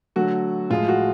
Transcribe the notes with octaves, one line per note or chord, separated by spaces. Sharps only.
D3 F#3 A3 F#4
A2 F3 G#3 F4
F#4